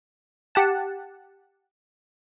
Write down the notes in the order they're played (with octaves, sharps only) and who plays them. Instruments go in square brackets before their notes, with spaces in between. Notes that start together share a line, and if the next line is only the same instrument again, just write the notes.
[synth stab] G4 F#5 A5